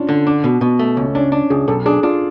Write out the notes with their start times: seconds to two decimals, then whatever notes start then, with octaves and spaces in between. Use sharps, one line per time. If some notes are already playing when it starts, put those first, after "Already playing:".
Already playing: C#4 D4 F4
0.09 D3
0.27 D4
0.44 B2
0.61 B2
0.79 A3
0.96 C#2 C#4
1.15 C#4 D4
1.32 D4
1.50 C#2 G#4
1.68 B1 A4
1.86 D4 G#4
2.03 D4 F4